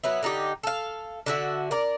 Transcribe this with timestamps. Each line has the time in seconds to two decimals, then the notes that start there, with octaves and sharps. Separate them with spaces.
0.04 F#3 B3 E4
0.23 D3 D#4 F4 G4
0.63 A4 F5
1.26 D3 F#4 E5
1.71 A#4 D5